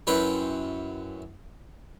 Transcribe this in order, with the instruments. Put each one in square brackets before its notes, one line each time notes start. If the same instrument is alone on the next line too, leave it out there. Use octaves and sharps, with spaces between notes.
[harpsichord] F#2 C#4 E4 B4 G5 C6